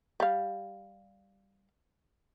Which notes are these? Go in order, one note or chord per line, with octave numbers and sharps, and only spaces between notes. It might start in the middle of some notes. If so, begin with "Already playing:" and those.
G3 F5